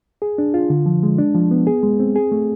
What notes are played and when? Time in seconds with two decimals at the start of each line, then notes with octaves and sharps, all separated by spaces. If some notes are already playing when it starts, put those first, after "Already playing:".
0.22 G#4
0.38 D4
0.54 F4
0.70 D3
0.86 F3
1.03 G#3
1.18 D4
1.34 F3
1.51 B3
1.67 G#4
1.83 G#3
2.00 C4
2.16 G#4
2.32 A3